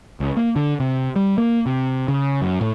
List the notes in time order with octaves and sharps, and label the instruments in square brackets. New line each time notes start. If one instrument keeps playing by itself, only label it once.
[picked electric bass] C#2
A#3
D3
C3
G3
A#3
C3
C#3
F#2
A2